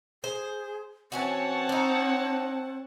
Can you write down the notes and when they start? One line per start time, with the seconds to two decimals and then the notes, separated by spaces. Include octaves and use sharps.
0.24 G#4 C5
1.12 E3 C4 C#4 F#4 C#5 F#5 A5
1.69 D4 D#4